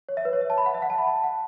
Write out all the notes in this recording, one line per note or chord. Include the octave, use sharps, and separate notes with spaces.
C#5
E5
B4
C#5
E5
A5
B5
F#5
E5
F#5
A5
B5
A5
F#5